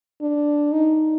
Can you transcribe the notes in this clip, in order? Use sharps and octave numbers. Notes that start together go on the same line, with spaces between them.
D4
D#4